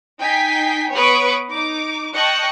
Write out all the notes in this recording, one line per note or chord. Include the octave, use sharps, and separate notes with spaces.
D#4 G5 G#5 B6 C7
B3 B4 C#5 C#6 D#6 D7
D#4 D6
D#5 G5 A5 C#6 F#6 C#7